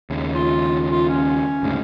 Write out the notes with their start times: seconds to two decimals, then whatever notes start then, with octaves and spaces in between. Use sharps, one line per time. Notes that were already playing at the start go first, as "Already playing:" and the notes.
0.10 D#2 C#3
0.35 F4
0.92 F4
1.09 C#4
1.63 D2 G#2 C#3